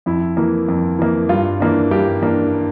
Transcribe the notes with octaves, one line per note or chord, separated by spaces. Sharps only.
F2 E4
E3 A#3
F2
E3 A#3
G2 F4
E3 A#3 D4
G2 G4
E3 A#3 D4